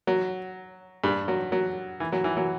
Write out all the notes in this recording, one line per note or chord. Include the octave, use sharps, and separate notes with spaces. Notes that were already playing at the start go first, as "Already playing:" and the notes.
F#3
G2 G3
F#3
F#3
E3
F#3
E3
F#3